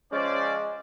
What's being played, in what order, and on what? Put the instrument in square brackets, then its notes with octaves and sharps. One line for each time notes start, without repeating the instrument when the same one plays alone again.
[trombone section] F3 C#4 [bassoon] G#3 [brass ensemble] C5 D5